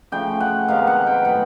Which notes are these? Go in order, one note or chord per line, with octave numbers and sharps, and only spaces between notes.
C#3 F3 A3 G5
F#5
C3 D#3 G#3 B3 F5
F#5
G5
A2 F#3 B3 F#5